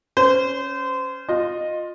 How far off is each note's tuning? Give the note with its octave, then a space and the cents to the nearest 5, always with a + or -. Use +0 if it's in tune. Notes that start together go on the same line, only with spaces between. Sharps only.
C#4 +0 C5 -25
F4 +15 D#5 -10